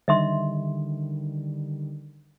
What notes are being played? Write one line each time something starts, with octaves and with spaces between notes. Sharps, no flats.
D3 D#3 G3 D#5 E5 C6